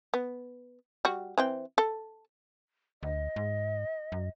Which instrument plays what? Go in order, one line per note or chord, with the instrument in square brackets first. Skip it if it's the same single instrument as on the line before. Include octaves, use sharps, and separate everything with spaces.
[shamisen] B3
G3 F#4
E3 C4 G5
A4
[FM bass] D2 [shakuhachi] D#5
[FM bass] G#2
F#2